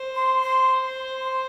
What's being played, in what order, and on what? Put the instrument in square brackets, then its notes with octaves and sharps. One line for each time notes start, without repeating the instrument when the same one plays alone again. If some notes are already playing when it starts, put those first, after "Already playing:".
Already playing: [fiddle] C5
[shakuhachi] C6
C6
C6